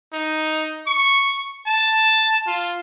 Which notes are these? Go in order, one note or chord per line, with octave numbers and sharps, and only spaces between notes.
D#4
C#6
A5
F4